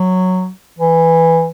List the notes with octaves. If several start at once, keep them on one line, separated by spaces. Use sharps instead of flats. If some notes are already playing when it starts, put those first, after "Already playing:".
Already playing: F#3
E3